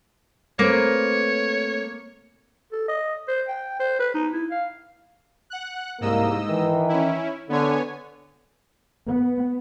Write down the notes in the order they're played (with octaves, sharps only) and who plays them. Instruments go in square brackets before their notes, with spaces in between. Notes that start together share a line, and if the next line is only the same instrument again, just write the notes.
[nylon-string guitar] A3 C4 B4 [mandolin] A#3 [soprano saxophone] C#5
[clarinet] A4
D#5
C5
G5
C5
B4
D#4
E4
F5
[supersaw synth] F#5 F#6
[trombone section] C2 A#3 [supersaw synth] G#2 D#5 E6
[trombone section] D#3 E3
[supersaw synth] C#4 E4
[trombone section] D3 [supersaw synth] B3 C#5 G#5
[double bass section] B3